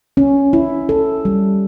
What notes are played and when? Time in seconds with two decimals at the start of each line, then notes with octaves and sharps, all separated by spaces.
0.17 C#4
0.53 E4
0.89 A4
1.25 G3